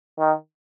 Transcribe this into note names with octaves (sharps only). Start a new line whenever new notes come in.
D#3